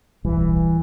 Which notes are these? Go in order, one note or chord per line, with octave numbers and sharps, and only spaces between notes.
D1 B1 E3 G3